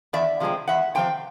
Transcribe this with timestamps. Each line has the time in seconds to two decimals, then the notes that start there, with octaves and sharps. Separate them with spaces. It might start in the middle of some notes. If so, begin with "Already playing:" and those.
0.13 E2 D5 E5
0.40 C3 F3 G#3 C4
0.68 E2 E5 F#5
0.95 C3 F3 C4 G5